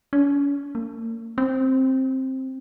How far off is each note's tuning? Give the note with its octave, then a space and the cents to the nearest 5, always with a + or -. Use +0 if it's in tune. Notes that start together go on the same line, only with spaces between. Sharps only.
C#4 +40
A#3 -35
C4 +10